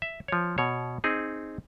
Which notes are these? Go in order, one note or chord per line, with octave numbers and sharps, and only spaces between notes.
E5
F3 C#5
B2 C#5
C4 D#4 G#4